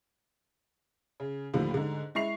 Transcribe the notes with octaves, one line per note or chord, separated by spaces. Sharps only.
C#3
D#2 A2 D3 F3
G#2 D3
G#3 E4 C#6 C7 F7